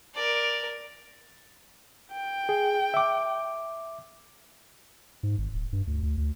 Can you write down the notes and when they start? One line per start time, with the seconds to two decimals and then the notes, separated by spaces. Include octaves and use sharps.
0.15 A#4 D5
2.13 G5
2.49 G#4
2.94 E5 D6
5.23 G#2
5.38 G#1
5.53 D1
5.72 G2
5.87 D2
6.03 D2
6.17 D2